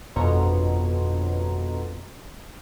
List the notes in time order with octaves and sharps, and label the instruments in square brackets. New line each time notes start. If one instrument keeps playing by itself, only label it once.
[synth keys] G1 F2 B2 C#5 A#5 C6